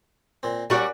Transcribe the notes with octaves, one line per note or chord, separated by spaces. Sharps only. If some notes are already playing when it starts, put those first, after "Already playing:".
A#2 C4
G3 C#4 F#4 A#4 D5